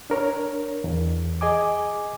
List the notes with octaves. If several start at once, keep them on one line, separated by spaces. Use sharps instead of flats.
D4 A#4 C#5
E2
G#4 D#5 G#5 D6